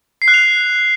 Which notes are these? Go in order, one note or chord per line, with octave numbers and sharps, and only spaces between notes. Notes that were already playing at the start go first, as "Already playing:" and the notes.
C7
F#6
F7